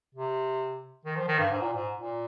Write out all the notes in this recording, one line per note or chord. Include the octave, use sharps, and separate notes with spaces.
C3
D#3
F3
D#3
G2
G#2
A#2
G#2
A#2